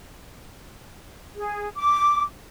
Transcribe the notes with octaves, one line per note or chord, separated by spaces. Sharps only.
G#4
D6